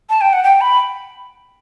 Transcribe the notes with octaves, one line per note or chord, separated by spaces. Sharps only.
A5
G5
F#5
G5
B5